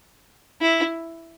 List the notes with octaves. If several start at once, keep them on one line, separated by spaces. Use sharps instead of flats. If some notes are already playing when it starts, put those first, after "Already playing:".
E4